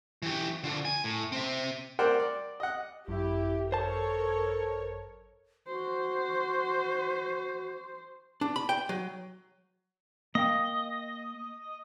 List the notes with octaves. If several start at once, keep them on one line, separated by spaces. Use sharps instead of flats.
E3 G4
D3 F3
G#5
A2
C4 E5
A#4 C5 D5 F#5 G5
D5
D#5 F#5
G#1 F#2 E4 G4
A4 A#4 C5 C#5 A5
F#4 C5
D4
B5
G5
F#3
A#3 D#5 F5 G5